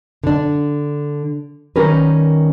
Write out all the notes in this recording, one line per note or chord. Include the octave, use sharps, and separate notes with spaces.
D3 D4
D#3 G3 C#4 A#4 B4